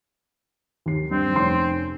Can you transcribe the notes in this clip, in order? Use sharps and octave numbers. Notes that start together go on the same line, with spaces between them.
D#2 C7
G2 C4
F1 C#4 C6